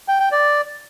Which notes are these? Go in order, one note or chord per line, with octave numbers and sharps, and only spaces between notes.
G5
G5
D5